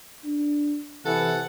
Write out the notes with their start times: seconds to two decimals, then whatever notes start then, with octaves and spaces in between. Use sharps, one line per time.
0.25 D4
1.06 C3 E3 A4 F#5